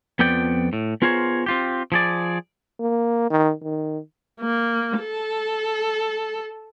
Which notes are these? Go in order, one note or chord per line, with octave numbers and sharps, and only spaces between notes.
F2 F3 B3 D5 G5
A2
B3 F4 G#4 A#4 C5 C#5
C4 F4 G4
F3 G#4 D5
A#3
D#3
D#3
A#3
A4